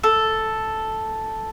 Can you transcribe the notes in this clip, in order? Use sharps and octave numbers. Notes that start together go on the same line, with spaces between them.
A4